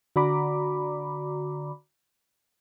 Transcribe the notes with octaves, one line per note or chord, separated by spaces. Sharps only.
D3 F#4 D5 A#5 B5 D6